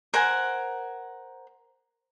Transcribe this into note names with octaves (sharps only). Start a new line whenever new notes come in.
A#4 C5 F#5 G#5